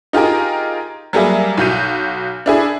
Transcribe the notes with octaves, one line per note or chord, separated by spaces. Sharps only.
D#4 F4 G4 G#4 A#4
F#3 G3 A#3 G#4 E5
B1 F#4 G6 D#7
D4 E4 G#4